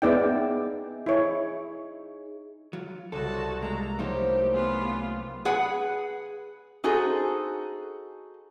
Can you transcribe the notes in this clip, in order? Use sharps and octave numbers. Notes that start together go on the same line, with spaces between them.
B3 D#4 G#4 D5 E5 G5
E4 C#5
F#3 F4
C2 G3 F#4 A4 C#5 A5 C6
G#3 A#3 A4 A#5
A2 F3 F#3 A3 A#3 D#4 G4 C5
B3 C#4 F4 G4 B4
G#4 B4 F#5
D#4 F#4 G#4 A4 C5